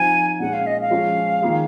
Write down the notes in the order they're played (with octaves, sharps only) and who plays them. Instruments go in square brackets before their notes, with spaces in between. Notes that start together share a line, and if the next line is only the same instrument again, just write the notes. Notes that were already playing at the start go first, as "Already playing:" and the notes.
Already playing: [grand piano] F3 C4 D#4 [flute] G#5
[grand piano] A#2 G#3 C#4 [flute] F#5
[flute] F5
D#5
F5
[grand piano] F3 G#3 C#4 F4
D#3 A#3 F4 G#4